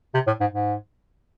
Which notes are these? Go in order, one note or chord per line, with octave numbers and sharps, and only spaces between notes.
C3
A2
G#2
G#2